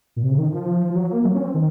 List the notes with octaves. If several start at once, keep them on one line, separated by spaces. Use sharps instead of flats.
A#2
C3
C#3
D#3
F3
F3
F#3
A#3
F#3
C#4
C4
D#3